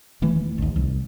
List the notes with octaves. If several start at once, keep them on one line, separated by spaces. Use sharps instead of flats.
E1 D#3 E3 A3
A1 D#2
C2